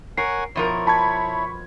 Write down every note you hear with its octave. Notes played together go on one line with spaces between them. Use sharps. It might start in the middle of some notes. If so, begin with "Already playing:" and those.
A#4 C#5 F#5 G#5 C7
B2 F3 E4 A#4 C#5
A5 B5 C#6 G#6